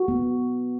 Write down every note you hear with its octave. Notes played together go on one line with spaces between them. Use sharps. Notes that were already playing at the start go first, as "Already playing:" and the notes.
Already playing: F#4
B3